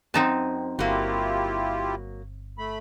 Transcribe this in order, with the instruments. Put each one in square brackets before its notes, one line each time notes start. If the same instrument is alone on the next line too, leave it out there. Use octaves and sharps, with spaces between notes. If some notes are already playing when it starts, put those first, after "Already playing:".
[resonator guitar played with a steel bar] F#2 [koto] C4 D#4 A5
[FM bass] G1 [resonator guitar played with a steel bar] F#3 A#3 [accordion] E4 F4 G4
[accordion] A3 B5